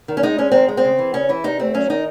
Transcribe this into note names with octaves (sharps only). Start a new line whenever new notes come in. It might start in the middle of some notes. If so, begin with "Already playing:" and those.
D#3
C#4
G#3 D#4
G#3 C#4
D#3 C4
G#3
C4
C#3
E3
C#3 C#4
E3 E4
C3 D#4
A3 C4
F#3 C#4
D#3 D#4